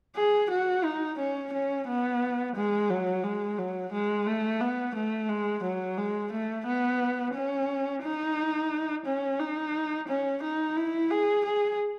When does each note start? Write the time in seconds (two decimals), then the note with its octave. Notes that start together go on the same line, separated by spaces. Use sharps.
0.16 G#4
0.50 F#4
0.84 D#4
1.18 C#4
1.53 C#4
1.87 B3
2.55 G#3
2.89 F#3
3.24 G#3
3.58 F#3
3.92 G#3
4.26 A3
4.60 B3
4.95 A3
5.29 G#3
5.63 F#3
5.97 G#3
6.32 A3
6.66 B3
7.34 C#4
8.02 D#4
9.05 C#4
9.39 D#4
10.08 C#4
10.43 D#4
10.76 E4
11.11 G#4
11.45 G#4